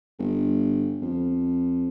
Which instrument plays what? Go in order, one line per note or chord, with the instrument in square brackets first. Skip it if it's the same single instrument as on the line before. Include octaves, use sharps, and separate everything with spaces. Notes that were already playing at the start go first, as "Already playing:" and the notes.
[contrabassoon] G1
F2